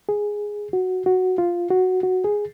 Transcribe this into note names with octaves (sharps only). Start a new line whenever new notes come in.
G#4
F#4
F#4
F4
F#4
F#4
G#4